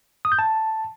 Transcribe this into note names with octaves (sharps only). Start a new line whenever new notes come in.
D#6
G6
A5